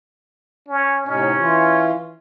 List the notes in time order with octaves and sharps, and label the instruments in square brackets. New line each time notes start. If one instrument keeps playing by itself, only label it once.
[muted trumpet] C#4
[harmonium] A2 C3 D#4 [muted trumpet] C#4
[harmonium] E3 F4